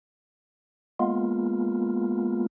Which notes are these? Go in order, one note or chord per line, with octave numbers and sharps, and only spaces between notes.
G#3 A#3 B3 F4